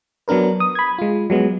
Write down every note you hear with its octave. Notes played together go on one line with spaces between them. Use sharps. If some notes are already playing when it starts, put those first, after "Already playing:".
F#3 B3 D4 A#4 B4
D#6
B5 G#6
G#3 F4
F#3 G#3 B3